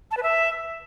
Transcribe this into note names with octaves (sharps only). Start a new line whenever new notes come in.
A5
B4
E5